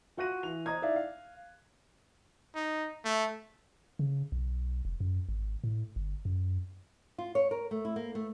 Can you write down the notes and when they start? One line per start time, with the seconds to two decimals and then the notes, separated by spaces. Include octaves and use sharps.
0.17 F4 F#4 C#6 F#6 A#6 D#7
0.43 E3 F7
0.66 C5 D#5 A#5 D#6 G#6
0.82 D#4 E4 D5 E5 F5
0.96 F5
2.56 D#4
3.05 A3
3.99 C#3
4.32 B1
4.85 F1
5.00 F#2
5.29 G#1
5.64 A2
5.96 G1
6.25 F#2
7.18 F4
7.35 C#5
7.51 A#4
7.71 A3
7.85 E4
7.96 A#3
8.15 A3